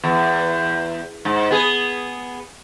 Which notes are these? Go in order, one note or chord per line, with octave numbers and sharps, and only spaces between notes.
E2
G#2
B3 G#4